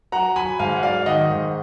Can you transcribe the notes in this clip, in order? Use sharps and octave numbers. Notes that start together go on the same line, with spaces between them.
F#3 F#5 A#5
F#3 G#5 B5
G#2 F5 G#5
F#5
F#3 D5 F5
D#3 D#5 F#5
G#2